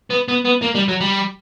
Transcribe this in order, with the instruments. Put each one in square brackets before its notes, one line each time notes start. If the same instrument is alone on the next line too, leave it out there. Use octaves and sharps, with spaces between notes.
[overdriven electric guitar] B3
B3
B3
A#3
G3
F#3
G3